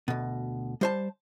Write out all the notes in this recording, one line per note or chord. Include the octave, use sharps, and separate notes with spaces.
D2 B2
G3 C5 A5